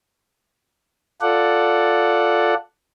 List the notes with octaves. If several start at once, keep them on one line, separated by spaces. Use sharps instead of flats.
F4 A4 D5 F#5